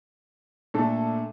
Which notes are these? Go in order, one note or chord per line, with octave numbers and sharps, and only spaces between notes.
A#2 A3 D4 A4